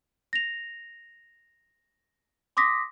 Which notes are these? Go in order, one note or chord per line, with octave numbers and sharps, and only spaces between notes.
A#6 F7
C6 D6 D#6 A#6 B6